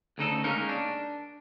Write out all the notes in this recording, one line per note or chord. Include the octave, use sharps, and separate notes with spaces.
D2 C#3 D#4 A4
G#3 A#3 C#4 D#4 A#4
D4